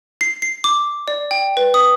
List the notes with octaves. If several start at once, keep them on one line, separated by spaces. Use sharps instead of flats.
C7
C7
D6
D5
G5
B4
D#6